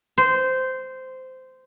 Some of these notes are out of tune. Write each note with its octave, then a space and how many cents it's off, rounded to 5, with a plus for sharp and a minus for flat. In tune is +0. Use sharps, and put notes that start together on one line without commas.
C5 -15